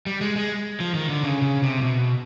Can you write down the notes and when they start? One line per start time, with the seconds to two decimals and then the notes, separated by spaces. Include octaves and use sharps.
0.06 G3
0.21 G#3
0.36 G#3
0.80 F3
0.94 D#3
1.09 D3
1.23 C#3
1.42 C#3
1.63 C3
1.82 B2